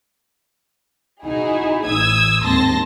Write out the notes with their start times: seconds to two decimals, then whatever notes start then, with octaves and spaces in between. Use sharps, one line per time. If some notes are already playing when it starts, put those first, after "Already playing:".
1.22 D#4 E4 F#4 G#4
1.86 A1 D#6 E6 G#6
2.43 D#2 G#2 C4 A5 C6 A#6